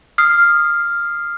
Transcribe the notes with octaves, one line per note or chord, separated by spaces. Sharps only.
D#6 F6 C7